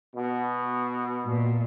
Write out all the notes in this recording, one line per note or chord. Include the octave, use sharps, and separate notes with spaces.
B2
A#2